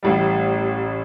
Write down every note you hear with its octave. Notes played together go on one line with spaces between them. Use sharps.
A1 A2 G3